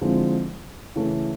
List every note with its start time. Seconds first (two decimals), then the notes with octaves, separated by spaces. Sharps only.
0.01 D3 F3 G#3 C4 E4
0.95 C#3 E3 A3